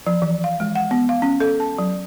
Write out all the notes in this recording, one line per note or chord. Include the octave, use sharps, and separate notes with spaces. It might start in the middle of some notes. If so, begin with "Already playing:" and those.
F3
E3
F5
G#3
F#5
B3
F5
C#4
A4
A5
F#3